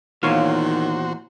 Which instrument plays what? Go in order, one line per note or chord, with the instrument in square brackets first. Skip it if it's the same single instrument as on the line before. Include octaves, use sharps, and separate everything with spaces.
[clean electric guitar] E2 A#2 [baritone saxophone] D#3 [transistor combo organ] F#4 C5 [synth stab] C#5 F5